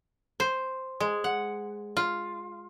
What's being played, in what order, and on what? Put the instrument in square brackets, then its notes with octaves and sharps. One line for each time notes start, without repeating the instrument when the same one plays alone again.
[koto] C5
G#3
F#5
F4